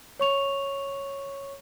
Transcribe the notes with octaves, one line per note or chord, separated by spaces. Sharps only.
C#5 C#6 F7